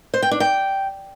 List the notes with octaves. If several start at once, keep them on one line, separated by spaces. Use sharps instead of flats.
C5
G5
D4
G5